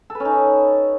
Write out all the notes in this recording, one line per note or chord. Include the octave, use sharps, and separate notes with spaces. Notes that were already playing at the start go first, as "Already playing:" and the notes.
A4
B4
C#4
D#4